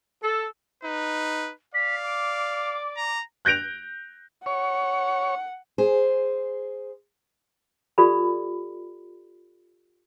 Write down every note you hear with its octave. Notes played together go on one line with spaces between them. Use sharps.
A4
D#4 B4
D5 F5 B6
D6
A#5
F#6 G6 A#6 D7 F7
C#5 F#5
G#4 C5
F4 G4 A4 D5 B5